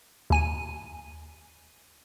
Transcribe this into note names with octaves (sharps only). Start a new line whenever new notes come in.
D#2 G#5 D#7